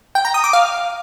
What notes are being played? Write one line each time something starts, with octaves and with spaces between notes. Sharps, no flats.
G5
A#5
D#6
D6
F5